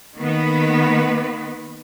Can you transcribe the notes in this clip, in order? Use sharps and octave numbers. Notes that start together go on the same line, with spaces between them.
D#3 A#3 B3 B4